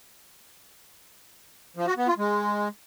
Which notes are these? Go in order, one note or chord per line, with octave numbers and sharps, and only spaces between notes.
F3
F#4
B3
F4
G#3